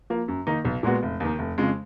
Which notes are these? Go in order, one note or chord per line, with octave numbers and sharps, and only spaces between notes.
F3 A#3
F#2
D#3 A#3 D#4
B1
A#2 G#3 B3 F#4
F1
D#2 D#3
F1
F2 C#3 F3 G#3